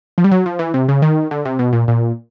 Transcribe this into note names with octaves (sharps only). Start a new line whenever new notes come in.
F3
G3
F#3
F3
E3
C3
C#3
D#3
D3
C3
B2
A#2
A#2